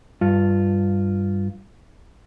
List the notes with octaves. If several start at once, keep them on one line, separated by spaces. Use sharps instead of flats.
G2 F4